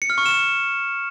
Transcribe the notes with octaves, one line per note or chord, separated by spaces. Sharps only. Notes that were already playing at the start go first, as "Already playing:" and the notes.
C#7
F6
C#6
E7